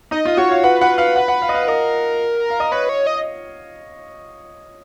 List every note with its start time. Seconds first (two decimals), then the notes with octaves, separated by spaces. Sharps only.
0.11 D#4 D#5
0.25 F4
0.28 D#5
0.37 F#4 C#5
0.51 F5
0.64 B4 F#5
0.81 B4 F#5
0.98 B4 F5
1.16 F#5
1.28 F#5
1.42 F5
1.49 D#5
1.55 F5
1.68 A#4 D#5
2.50 F5
2.60 D#5
2.72 B4 C#5
2.89 C#5
3.07 D#5